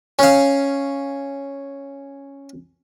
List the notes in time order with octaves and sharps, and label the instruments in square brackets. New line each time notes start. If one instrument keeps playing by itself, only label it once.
[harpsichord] C#4 F5